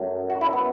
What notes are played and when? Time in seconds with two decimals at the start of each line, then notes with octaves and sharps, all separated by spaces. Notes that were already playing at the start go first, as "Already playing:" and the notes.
Already playing: F#2 F#3 A3
0.30 F#4
0.41 E4
0.53 B3